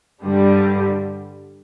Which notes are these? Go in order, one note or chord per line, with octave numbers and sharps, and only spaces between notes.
G2 D3 G3